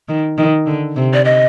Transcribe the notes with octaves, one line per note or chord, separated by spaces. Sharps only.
D#3
D#3
D3
C3
D5
D#5